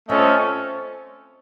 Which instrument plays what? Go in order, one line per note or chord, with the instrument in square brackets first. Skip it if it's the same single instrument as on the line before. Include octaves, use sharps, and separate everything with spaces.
[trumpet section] A3 C#4 F4 A4 D#5 [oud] C4